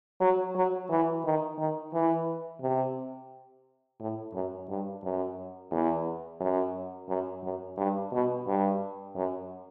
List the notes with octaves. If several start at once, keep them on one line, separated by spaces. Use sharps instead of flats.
F#3
F#3
E3
D#3
D#3
E3
C3
A2
F#2
G2
F#2
E2
F#2
F#2
F#2
G2
B2
G2
F#2